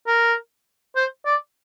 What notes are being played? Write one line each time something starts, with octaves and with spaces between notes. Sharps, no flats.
A#4
C5
D5